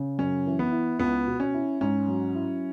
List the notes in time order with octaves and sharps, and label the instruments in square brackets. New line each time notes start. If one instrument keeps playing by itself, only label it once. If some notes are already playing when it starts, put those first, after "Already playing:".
Already playing: [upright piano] C#3
[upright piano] F#2 [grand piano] C#4
[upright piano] E3
[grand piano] B3
[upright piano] E4
[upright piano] C#2 [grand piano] B3
[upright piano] B2
[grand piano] C#4
[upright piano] E4
[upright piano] G#2 [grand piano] C#4
[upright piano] F#3
E4